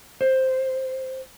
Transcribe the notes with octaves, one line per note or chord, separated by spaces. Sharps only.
C5